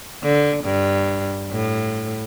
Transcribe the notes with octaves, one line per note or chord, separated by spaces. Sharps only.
D3
G2
A2